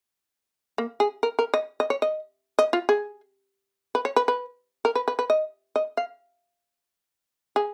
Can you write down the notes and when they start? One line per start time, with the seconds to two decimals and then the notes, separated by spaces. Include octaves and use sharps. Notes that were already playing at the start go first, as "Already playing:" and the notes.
0.78 A#3
1.00 G#4
1.23 A#4
1.39 A#4
1.54 D#5
1.80 D#5
1.90 C#5
2.02 D#5
2.59 D#5
2.73 F4
2.89 G#4
3.95 B4
4.05 C#5
4.16 B4
4.28 B4
4.85 A#4
4.95 B4
5.08 B4
5.19 B4
5.30 D#5
5.76 D#5
5.97 F5
7.56 G#4